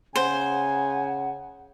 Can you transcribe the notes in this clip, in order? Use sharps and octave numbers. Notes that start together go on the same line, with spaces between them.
C#3 C5 F#5 G#5